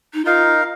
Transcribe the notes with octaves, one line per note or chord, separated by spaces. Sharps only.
D#4
D#4 F4 A#4 F5